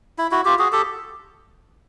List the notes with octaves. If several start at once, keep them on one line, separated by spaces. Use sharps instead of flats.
E4
E4 F#4
F4 G4
F#4 G#4
G4 A4